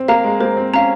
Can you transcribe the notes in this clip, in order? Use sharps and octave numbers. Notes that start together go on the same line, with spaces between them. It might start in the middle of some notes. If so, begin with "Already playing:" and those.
Already playing: C4
A#3 F5 A#5
G#3
A#3 C5
C4
C#4 F5 A#5